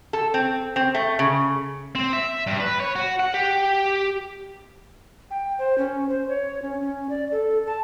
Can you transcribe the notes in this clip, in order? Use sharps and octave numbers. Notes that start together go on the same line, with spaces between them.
A4
C4
C4
A3
C#3
C4
E5
G2
B4
C#5
F#4
F#5
G4
G5
C5
C#4
C5
C#5
C#4
C#4
D5
A4
A5